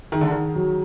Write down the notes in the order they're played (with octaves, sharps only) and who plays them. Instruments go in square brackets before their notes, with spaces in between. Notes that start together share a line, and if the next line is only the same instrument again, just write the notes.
[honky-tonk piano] D#3 [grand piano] G#4
[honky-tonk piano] D3
D#3
[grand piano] F#3